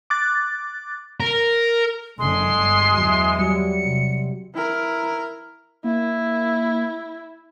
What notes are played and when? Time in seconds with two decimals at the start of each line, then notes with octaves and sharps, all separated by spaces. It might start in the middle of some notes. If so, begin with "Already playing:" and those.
0.10 D6 F#6 A6
1.20 A#4
2.19 F#1 D3 G#3 C6
2.53 G1
2.98 E2 E3 F#3
3.39 F#3 G3 C#7
3.83 C3
4.54 E4 A#4
5.84 A#3 E4